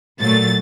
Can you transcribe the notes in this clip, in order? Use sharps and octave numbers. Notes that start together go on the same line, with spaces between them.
A#2 F#3 A3 A6